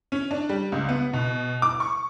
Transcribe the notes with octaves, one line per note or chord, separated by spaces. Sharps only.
C#4
D4
G3
C#2
B3
B2
D6
C#6